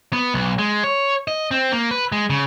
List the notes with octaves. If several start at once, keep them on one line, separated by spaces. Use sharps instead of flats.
B3
B1
G#3
C#5
D#5
C4
A#3
B4
G#3
C#3